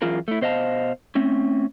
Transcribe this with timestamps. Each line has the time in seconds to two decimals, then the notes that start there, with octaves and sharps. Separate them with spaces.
0.02 F#2 E3 F4 G#4 A#4
0.28 A3 E4
0.41 B2 C5 D#5 F5 A5
1.15 A3 C4 C#4